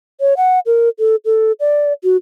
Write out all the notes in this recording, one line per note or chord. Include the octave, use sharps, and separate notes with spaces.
C#5
F#5
A#4
A4
A4
D5
F#4